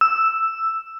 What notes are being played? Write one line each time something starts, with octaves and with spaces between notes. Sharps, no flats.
E6